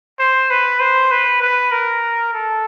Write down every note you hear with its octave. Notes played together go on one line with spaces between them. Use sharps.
C5
B4
C5
B4
B4
A#4
A4